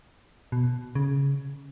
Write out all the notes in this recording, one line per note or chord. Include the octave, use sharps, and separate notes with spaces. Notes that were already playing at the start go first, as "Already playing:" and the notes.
B2
C#3